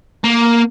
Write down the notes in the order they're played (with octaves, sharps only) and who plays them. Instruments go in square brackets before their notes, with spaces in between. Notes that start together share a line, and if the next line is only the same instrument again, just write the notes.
[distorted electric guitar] A#3